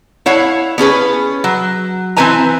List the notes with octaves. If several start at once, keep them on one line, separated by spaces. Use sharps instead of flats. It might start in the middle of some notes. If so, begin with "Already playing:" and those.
E4 C#5 F5 F#5
B3 C#4 G#4 B4
F#3
E3 C4 B4 C5 G#5 A#5